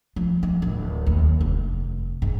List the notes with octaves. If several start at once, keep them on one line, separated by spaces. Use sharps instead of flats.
F3
F3
D1
D#2
F1
G#2